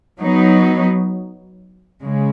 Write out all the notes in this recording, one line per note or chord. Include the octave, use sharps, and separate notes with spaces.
F#3 B3 D#4
C#3 G#3